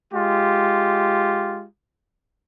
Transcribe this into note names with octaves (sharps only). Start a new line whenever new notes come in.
G#3 F4 G4